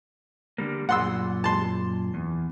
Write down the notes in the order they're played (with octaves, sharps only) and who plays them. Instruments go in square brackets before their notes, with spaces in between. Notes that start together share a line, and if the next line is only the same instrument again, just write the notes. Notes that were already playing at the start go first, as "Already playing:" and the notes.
[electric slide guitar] D3 G3 A#3
[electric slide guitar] F#2 A#2 [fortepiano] F#5 C6 E6
[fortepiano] A5 C6
[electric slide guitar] E2